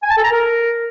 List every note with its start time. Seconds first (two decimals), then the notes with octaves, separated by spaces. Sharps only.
0.03 G#5
0.10 A5
0.17 A4
0.24 A#5
0.31 A#4